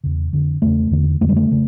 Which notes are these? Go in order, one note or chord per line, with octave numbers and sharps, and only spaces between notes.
E2 C#3
F2 D3
E2 C#3 A3
E2 D3
F2 D3 A3
G3
A3
C#3